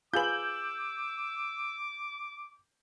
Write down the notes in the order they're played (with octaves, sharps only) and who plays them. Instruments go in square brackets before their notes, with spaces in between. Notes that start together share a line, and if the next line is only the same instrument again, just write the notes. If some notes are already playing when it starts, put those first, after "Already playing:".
[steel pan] F4 G#4 B4 [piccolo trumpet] D6 [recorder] E6 [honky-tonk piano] G6 F#7